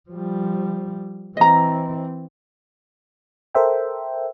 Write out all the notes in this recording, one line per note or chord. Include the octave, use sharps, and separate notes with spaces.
F3 G3
E3 C4 D#5 A#5
A4 A#4 C5 E5 G5